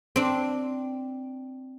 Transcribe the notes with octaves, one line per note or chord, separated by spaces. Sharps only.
C4 D4